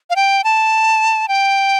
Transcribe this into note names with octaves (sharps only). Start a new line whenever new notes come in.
F5
G5
A5
G5